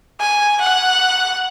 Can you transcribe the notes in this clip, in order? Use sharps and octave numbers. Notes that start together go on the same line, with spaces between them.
G#5
F#5